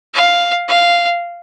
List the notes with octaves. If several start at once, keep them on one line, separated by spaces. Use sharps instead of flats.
F5
F5